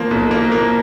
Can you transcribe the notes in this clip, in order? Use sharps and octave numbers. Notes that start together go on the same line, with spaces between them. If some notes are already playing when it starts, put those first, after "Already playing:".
Already playing: F3 A#3 C5
B1
A#3
A#3